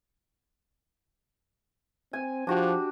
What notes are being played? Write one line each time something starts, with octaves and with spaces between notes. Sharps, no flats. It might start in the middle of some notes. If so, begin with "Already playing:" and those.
C4 G#5
F3 D4 F#4 G4